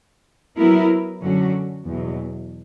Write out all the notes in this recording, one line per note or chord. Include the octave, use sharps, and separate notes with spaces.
F#3 B3 E4 A#4
F#2 D3 F#3 C#4 F#4
E2 B2 F#3